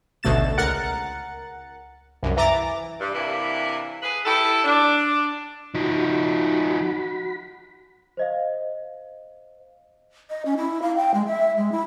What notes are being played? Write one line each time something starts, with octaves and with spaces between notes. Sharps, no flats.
A1 D2 B2 A3 A6 E7
C#2 A#4 F#5 F#6 A6 C#7
C2 F#2
E3 A#5 D6 A6
G2
C3 E3 A#3 D4 E4
G#4 B4
E4 G4 A4
D4
F3 D#4 F#4 B5
C5 D#5 F5
D#5
C#4
E4
F5
G5
G#3
E5
G#3
E4